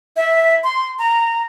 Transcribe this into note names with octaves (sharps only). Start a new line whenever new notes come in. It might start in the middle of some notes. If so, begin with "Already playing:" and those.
E5
C6
A#5